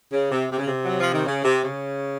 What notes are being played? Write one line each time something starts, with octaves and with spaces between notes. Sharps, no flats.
C#3
C3
C3
C#3
C3
F#3
F3
D#3
C#3
C3
C#3